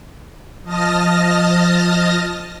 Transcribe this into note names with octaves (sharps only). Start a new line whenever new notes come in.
F3 D#5 A5 D#6 F6 A#6